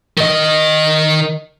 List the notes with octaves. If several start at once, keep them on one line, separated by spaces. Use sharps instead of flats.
D#3 D#5